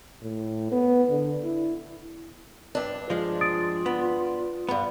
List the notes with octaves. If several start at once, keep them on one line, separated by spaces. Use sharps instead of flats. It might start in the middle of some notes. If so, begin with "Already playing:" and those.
A2
B3
D3
E4
G2 D4 B4
F3 G#3 F4
D#6 A6 D7
B3
G2 B3 B5